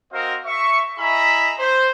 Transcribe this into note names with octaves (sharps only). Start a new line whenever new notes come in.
C4 F#4 A#4 C5 D#5 F5
E5 C#6
E4 G#4 D#5 E5 A#5 B5
C5